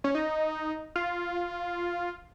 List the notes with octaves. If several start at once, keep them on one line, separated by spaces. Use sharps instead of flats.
C#4
D#4
F4